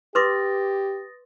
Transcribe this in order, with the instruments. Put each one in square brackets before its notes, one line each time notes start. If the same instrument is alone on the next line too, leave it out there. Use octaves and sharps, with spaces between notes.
[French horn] G4 [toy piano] B4 C6 D6 [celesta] D#6 A6 A#6